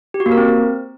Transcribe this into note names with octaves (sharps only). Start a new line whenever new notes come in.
G4
F#4
A#3
A#4
C4